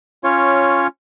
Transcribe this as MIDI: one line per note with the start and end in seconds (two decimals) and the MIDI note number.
0.24 0.87 61
0.24 0.87 65
0.24 0.87 73